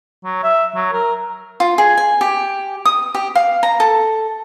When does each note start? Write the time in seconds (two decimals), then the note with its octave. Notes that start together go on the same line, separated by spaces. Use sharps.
0.24 F#3
0.43 E5
0.75 F#3
0.92 A#4
1.60 F4
1.78 G#4
1.97 G#5
2.21 G4
2.85 D#6
3.15 G4
3.35 F5
3.63 A#5
3.80 A4